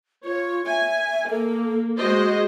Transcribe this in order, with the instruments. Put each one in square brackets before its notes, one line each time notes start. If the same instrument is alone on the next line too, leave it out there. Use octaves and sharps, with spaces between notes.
[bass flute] F4 [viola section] C#5
[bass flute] E5 [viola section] G#5
[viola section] A#3 [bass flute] A4
[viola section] G#3 C5 D#5 [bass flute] F#4